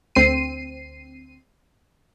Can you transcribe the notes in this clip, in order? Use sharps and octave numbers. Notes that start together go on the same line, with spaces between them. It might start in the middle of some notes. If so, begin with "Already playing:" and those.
D2 C4 C7 D#7